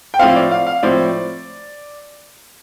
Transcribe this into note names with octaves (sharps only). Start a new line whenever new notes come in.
G5
A2 F3 C4 F5
D5
F5
F5
A2 F3 C4 D5